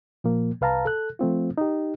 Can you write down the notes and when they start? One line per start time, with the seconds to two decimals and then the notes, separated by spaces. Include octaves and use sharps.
0.24 A#2 F3 A#3
0.61 C2 B4 F5 A5 A#5
0.85 A4 F#6
1.19 F3 A3 C4 F4
1.58 D#4 G4